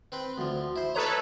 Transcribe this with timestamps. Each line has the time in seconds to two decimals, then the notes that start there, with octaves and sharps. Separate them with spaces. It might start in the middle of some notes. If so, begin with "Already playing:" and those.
0.12 C4 B4 G5
0.38 D2 F3
0.76 E4 C5
0.95 A4 B4 C#5 D#5 A#5